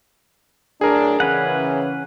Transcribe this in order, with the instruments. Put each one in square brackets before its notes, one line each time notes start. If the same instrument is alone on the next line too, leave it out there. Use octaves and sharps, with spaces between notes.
[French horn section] A2 F#3 D4 [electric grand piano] G#4 A#4
[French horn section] C#3 E3 [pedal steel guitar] C#4 B4 F#5